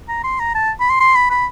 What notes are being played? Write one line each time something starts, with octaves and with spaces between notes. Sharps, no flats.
A#5
C6
A#5
A5
B5
C6
C6
B5
B5